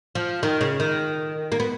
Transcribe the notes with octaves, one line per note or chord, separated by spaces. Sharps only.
F3
D#3
C#3
D#3
A#3
B3